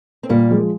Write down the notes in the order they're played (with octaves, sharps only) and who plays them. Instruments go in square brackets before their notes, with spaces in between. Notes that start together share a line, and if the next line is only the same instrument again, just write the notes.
[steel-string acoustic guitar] C4
[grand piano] A#2 [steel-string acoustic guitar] G3 A#3
[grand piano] F3 G#3